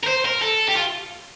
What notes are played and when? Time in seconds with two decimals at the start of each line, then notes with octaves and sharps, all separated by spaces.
0.04 A#4
0.07 C5
0.25 A#4
0.42 A4
0.68 G4
0.77 F4